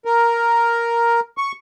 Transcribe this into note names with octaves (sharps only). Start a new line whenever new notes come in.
A#4
C#6